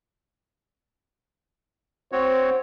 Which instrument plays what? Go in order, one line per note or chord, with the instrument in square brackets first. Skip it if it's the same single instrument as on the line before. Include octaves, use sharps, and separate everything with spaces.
[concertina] C4 F#4 C#5 [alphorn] C5